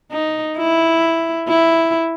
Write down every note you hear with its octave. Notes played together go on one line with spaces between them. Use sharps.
D#4
E4
E4